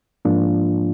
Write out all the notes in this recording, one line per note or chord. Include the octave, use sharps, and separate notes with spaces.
G#2 F3 A#3 D4 F4